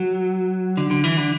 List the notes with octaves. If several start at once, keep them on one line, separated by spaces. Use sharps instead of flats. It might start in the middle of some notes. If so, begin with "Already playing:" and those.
Already playing: F#3
D3
D3
E3
D3